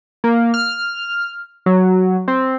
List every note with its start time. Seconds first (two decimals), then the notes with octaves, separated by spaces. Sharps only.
0.24 A#3
0.54 F6
1.66 F#3
2.28 C4